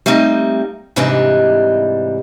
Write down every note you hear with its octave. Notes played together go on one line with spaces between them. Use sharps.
G3 A3 A#3 C4 D#4
G#2 C3 E3 G3 D4 D#4